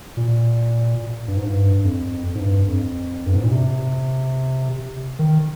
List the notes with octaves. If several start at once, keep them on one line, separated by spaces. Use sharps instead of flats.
A#2
G2
G#2
G2
F2
G#2
G2
F2
G2
G#2
A#2
C3
D#3